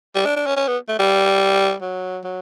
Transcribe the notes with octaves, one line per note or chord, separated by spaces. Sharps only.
G3
D4
D4
C#4
C#4
B3
A3
G3
F#3
F#3